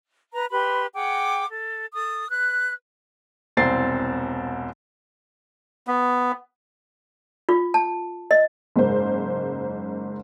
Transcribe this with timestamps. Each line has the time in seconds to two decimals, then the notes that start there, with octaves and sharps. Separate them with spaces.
0.34 B4 A#5
0.51 G4 B4 B5 C6
0.94 G#4 F#5 G5 D6
1.50 A4
1.93 A4 D#6
2.30 B4 F#6
3.57 E1 C2 C4 A6 C7
5.87 B3
7.49 F4
7.74 A5
8.31 D#5
8.76 F#1 G#2 A#4 C5